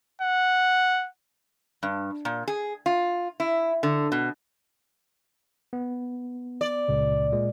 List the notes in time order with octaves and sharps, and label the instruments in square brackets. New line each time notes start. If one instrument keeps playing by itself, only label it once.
[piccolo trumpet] F#5
[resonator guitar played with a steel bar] G2
A#2
G#4
F4
E4
D3
B2
[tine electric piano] B3
[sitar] D5
[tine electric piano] C#2 A#2 C#3
A#2 G#3